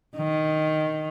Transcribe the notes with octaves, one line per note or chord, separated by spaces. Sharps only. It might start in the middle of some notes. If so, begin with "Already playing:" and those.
D#3